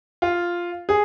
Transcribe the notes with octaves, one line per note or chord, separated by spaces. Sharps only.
F4
G#4